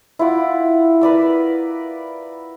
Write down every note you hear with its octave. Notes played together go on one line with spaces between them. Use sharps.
E4 F4 F#5 D6
A#4 B4 D5 E6